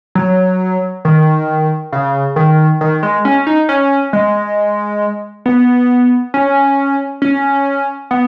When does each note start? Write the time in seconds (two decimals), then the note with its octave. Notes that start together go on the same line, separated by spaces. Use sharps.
0.15 F#3
1.05 D#3
1.93 C#3
2.36 D#3
2.81 D#3
3.03 G#3
3.25 C#4
3.47 D#4
3.69 C#4
4.13 G#3
5.46 B3
6.34 C#4
7.22 C#4
8.11 B3